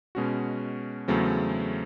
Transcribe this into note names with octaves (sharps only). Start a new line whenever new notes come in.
B2 G#3 C#4 F#4
E2 C#3 F#3 A3 C4